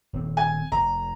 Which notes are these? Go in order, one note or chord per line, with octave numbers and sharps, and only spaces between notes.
D#1 C4
G#5
F1 A#5